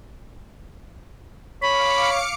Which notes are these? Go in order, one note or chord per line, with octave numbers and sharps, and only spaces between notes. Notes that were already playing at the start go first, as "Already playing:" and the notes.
C#5 F5 B5 D6 C#7